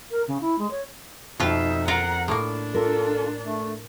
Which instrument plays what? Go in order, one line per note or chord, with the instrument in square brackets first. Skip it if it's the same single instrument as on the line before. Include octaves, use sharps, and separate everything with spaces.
[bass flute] A#4
C#3
E4
G#3
C#5
[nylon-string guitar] F2 [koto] B2 F4 [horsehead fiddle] D#4 E5
[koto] F4 A#4 [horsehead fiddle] F#5 A#5
[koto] A2 A#3 [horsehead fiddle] D4
[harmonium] F4 A4 [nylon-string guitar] A#4
[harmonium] A3